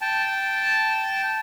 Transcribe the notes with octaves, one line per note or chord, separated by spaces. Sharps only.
G5 A5